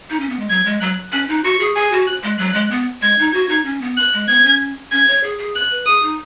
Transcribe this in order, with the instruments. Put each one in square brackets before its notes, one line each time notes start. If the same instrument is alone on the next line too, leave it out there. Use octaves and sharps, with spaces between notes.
[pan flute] D#4
C#4
B3
G#3
[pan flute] F#3 [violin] G#6
[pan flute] G#3
[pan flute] F#3 [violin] F#6
[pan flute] C#4 [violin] F#6
[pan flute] D#4
[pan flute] F#4 [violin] C#6
[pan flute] G#4
[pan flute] G#4 [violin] G#5
[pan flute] F#4
[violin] F#6
[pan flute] G#3
[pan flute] F#3 [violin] F#6
[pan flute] G#3
B3
[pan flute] G#3 [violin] G#6
[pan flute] D#4
[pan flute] F#4 [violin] G#6
[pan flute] D#4
C#4
B3
[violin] F#6
[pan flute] G#3
[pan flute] B3 [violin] G#6
[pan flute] C#4
[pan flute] C#4 [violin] G#6
[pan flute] C#5
G#4
G#4
[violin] F#6
[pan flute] B4
[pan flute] G#4 [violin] D#6
[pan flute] D#4